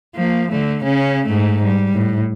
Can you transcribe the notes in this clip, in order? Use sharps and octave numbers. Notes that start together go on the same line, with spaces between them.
F3 A#3
D3 A3
C#3 C#4
G#2 A3
G3
A2